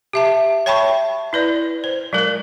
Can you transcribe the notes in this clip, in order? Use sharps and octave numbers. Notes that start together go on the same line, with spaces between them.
G4 E5 A5
C#5 E5 G5 A5 B5 C#6
E4 B4 D5
C5
F#3 G#3 A#4